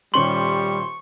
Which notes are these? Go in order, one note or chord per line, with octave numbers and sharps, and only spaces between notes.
D#1 G3 C#4 C6 C#6 F#7